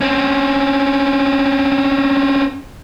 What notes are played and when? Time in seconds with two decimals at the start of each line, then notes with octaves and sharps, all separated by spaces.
0.01 C4 C#4